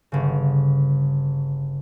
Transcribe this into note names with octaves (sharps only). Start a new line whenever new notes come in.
G1 C#3